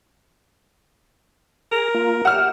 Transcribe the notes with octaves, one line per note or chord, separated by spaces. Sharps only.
G#4 A#4 A#6
A#3 F4
G4 E5 F#5 F6